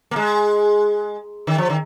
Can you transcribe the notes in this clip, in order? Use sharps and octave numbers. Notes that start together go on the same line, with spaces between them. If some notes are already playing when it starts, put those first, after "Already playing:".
A#3
G#3
D#3
F3
D#3